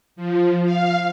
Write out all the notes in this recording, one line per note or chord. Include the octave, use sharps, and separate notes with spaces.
F3
F5